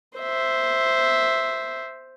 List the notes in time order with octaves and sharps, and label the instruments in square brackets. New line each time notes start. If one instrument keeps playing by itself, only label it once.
[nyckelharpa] C5 E5